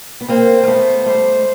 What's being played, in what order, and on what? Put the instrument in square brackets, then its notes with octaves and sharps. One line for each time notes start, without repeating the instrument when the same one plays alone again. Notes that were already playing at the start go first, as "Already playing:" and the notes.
[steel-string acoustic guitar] B3
[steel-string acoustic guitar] A#3 C4 [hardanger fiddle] C5
[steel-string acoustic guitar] A#3
A3 B3
[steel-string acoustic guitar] G3 A3 [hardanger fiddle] C5
[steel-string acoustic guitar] G#3